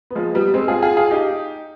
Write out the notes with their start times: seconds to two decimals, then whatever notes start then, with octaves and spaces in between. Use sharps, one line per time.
0.10 B3
0.15 F3 G#3
0.35 G3 B3
0.54 G#3 C4
0.68 F4 G#4
0.82 F4 G#4
0.97 F4 G#4
1.11 D#4 G4